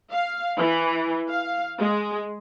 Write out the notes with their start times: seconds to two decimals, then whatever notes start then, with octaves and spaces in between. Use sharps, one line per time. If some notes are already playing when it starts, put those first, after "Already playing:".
0.11 F5
0.58 E3
1.29 F5
1.79 G#3